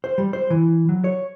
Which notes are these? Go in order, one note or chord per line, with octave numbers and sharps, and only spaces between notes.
C5
G3
C5
E3
F#3
C#5